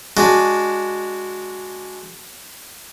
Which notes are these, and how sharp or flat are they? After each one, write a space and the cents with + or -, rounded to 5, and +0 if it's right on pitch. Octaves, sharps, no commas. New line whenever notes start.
G#3 +0 D4 -5 F#4 +0